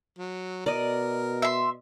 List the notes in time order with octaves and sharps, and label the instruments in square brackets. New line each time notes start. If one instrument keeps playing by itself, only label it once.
[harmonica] F#3
[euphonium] B2 [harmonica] A#4 [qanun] D5 D#5
[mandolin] E5 C6